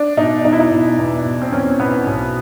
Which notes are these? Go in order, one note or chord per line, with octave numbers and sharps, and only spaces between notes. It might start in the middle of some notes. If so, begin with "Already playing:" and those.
Already playing: D4
B2 D#4
E2 D#4
E4
D#4
B2
E2
B2
C4
E2 C#4
B2 B3
B1